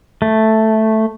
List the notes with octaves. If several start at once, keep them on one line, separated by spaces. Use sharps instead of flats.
A3